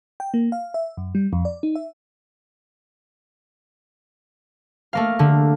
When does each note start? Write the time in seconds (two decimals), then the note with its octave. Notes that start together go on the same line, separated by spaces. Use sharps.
0.20 G5
0.34 A#3
0.52 F5
0.74 E5
0.97 F#2
1.15 G3
1.33 F2
1.45 D5
1.63 D#4
1.76 E5
4.93 A3 A#3 F5
5.19 D3